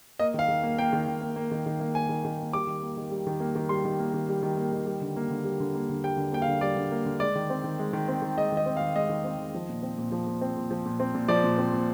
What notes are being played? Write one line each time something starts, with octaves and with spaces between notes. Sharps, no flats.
A#3 D#5
D#3 F5
D#3
A#3
A#3 G5
D#3
D#3
A#3
A#3
D#3
D#3
A#3
A#3 G#5
D#3
D#3
A#3
G3 D6
D#3
A#3
D#3
G3
D#3
A#3
D#3
G3 C6
D#3
A#3
D#3
G3
D#3
A#3
D#3
G3
D3
A#3
D3
G3
D3
A#3
D3
G3 G5
D3
A#3 G5
F5
D3
G3 D5
D3
A#3
D3
G#3 D5
D#3
C4
D#3
G#3
D#3
C4
D#3
G#3 D#5
D#3 D#5
C4
F5
D#3
G#3 D#5
D#3
C4
D#3
F3
A#2
C4
A#2
F3
A#2
C4
A#2
F3
A#2
C4
A#2
F3 D5
A#2
C4
A#2